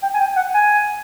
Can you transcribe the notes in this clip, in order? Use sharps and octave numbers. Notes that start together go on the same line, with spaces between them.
G5
G#5
G5
F#5
G#5